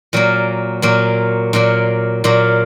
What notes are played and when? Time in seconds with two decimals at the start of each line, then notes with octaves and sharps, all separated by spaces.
0.13 A#2 F#3 A#3
0.82 A#2 F#3 A#3
1.53 A#2 F#3 A#3
2.24 A#2 F#3 A#3